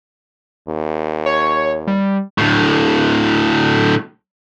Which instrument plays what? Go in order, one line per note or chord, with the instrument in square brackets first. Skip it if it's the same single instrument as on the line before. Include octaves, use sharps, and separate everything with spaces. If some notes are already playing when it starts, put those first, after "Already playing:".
[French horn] D#2
[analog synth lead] C#5
G3
[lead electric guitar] D2 A2